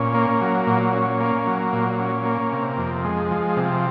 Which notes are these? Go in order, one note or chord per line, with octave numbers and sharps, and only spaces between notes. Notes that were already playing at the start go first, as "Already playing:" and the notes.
Already playing: A#2 C#4
A#3
F#3
A#2
C#4
A#3
F#3
A#2
C#4
A#3
C3
F2
G#3
F3
C3